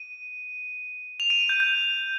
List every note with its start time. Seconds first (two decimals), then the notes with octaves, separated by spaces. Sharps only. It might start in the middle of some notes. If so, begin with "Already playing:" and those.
Already playing: D#7
1.20 F7
1.30 D#7
1.49 G6
1.60 G6